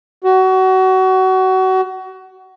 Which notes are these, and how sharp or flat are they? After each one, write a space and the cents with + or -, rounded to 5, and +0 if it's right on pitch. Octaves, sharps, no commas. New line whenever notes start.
F#4 +25